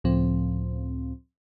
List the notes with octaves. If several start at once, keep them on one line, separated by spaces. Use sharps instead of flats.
C#2 A2 F3 C4